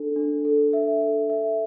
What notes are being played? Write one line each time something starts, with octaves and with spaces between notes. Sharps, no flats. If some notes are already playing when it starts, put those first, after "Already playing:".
Already playing: D4 A4
D4
A4
E5
A4
E5